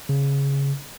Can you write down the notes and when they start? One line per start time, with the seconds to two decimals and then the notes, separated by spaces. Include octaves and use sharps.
0.09 C#3